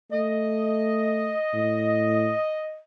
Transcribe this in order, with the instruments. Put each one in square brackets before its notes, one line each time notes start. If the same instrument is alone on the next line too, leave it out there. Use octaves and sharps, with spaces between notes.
[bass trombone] A3 [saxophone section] D#5
[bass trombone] A2